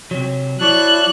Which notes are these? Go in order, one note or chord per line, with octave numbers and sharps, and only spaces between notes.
C3 F#3
F#3 E4 D5 A5 C#6 F#6